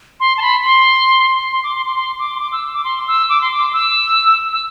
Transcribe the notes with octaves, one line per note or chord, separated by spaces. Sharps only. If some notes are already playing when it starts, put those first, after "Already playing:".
C6
A5
B5
C6
C6
D6
C6
C6
C6
D6
C6
D6
E6
D6
C6
E6
D6
C6
D6
E6
E6